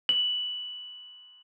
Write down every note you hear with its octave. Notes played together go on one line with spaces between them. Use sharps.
F#7